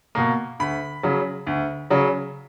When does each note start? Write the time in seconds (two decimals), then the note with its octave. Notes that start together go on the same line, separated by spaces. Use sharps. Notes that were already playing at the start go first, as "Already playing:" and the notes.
0.15 B2 A#3
0.60 D2 B5
1.03 C#3 F#3
1.47 D2
1.90 C#3 F#3